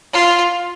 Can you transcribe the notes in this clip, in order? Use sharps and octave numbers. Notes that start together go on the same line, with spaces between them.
F4